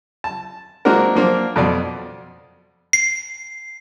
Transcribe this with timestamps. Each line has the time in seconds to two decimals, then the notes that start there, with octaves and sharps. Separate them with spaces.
0.24 A5
0.85 G#3 A#3 C4 D4 F#4 A#4
1.15 F3 A#3 D4
1.56 F2 B2 D5
2.93 C7